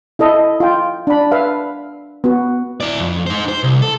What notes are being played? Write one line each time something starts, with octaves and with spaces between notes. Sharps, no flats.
E4 A4 D#5 E5
F4 G5
D4 B5
B4 E5 F5
B3 F#4
E4 D5
F2
D#4 C5
C5
C2
A4